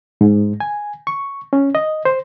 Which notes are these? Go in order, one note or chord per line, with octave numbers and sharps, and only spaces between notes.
G#2
G#5
C#6
C#4
D#5
C5